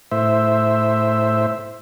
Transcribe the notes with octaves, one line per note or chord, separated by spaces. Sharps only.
A2 C5 E5